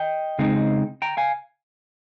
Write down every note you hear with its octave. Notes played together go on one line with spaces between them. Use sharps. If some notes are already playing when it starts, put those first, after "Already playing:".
Already playing: D#5 G5
C#3 G#3 C4 D#4
G5 A#5
F5 G#5